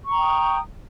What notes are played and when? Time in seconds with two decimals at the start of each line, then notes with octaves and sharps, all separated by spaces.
0.05 C#6
0.10 A#5
0.15 G5
0.19 D#6